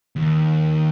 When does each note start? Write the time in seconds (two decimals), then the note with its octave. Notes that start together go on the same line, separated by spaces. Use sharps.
0.16 D#2